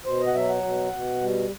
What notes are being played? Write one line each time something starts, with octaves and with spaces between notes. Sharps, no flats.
B2 C5
D#5
F#5
F#3 E5
F#5
B2
B2
G3